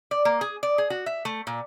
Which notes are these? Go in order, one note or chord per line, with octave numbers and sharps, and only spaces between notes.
D5
A#3
G#4
D5
G#4
F#4
E5
A3
A#2